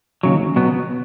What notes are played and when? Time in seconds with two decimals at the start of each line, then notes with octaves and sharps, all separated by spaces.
0.23 D#2 C#3 F#3
0.56 B2 F#3 B3